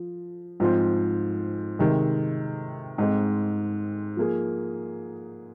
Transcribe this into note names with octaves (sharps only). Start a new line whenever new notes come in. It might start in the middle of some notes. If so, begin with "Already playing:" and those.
Already playing: F3
G#2 F3 C4 F4 C5
C3 D#3 G#3
G#2 G#3 C4
F3 A#3 G#4